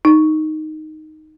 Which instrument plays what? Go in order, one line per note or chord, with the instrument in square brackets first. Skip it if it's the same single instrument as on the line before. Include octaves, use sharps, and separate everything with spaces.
[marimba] D#4